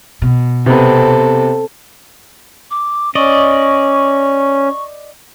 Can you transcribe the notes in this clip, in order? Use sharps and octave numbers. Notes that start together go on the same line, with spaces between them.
B2
C3 B3 C4 A4
D6
C#4 D5 D#5 C#6